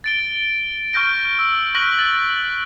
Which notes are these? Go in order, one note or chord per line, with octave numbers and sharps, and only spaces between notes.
A6 D7 G7
C#6 F6 G6 A#6 D7
E6
C#6 F6 F#6 A#6 B6 F#7
A6